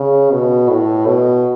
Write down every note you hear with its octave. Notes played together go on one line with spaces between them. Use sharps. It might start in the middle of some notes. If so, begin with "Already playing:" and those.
Already playing: C#3
B2
A2
B2